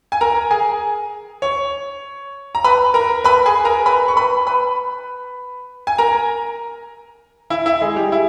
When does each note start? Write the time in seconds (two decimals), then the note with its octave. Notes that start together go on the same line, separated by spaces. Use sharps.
0.12 G#5
0.21 A#4 A#5
0.51 G#4 G#5
1.42 C#5 C#6
2.55 A#5
2.64 B4 B5
2.94 A#4 A#5
3.24 B4 B5
3.46 G#4 G#5
3.65 A#4 A#5
3.86 B4 B5
4.08 C#6
4.16 B4 B5
4.47 B4 B5
5.87 G#5
5.98 A#4 A#5
7.50 E4 E5
7.66 E4 E5
7.81 G#3 G#4
7.96 G3 G4
8.12 E4